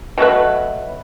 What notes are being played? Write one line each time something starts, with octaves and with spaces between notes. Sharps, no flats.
B2 F#3 A3 B4